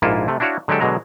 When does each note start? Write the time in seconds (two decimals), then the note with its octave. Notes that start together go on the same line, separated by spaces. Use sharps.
0.02 A#1 G#2 A#3 E4 F4 A4
0.28 C3 A3
0.40 D4 E4 F#4 C#5 F5
0.68 D3 F#3 G#3 G4 A4
0.80 B2 D3 F#3 G#3 A#5